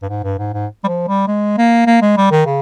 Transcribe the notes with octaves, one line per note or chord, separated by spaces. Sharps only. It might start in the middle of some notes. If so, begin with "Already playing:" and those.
G2
G#2
G2
G#2
G#2
G3
F3
G3
G#3
A#3
A#3
G#3
G3
D#3
C#3